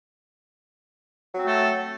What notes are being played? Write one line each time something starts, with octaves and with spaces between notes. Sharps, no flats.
F#3 A3 C4 A4